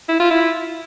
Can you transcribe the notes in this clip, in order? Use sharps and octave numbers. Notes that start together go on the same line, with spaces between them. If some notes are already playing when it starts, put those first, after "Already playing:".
E4
F4
E4